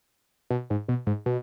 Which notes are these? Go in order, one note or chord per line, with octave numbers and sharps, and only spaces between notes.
B2
G#2
B2
G#2
B2